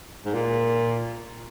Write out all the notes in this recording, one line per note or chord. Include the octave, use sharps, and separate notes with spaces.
G#2
A#2